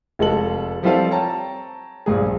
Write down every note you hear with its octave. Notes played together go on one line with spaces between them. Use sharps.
F1 G#3 F4 A4 F#7
F3 G3 C4 F4 A4 F5
C#5 G5 A5 A#5
A#1 G2 G#4